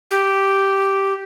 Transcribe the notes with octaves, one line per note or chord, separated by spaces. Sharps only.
G4